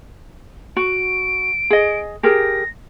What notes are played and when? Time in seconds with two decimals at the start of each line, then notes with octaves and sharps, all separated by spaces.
0.77 F#4 D7
1.70 G#4 D#5
2.23 G4 G#4 A#4 A#6